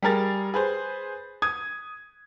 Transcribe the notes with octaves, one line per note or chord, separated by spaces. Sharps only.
G3 G#4 A#4 A6
G#4 B4 C5
D#6 G#6